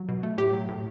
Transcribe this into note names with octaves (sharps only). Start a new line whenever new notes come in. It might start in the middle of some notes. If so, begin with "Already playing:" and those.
Already playing: F#3
B2
A3
A2 G4
F#3
A2